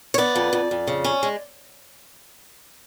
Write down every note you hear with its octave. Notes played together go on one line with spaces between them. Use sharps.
C#5
B3 D5
F2
F2
F2
C#3
C#4
G#3